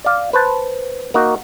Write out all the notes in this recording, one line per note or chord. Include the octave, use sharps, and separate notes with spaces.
D5 F5
B4 C5 A5
A#3 D#4 F#4